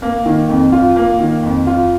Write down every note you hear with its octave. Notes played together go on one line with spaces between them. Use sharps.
A#3
D#3
F2
F4
A#3
D#3
F2
F4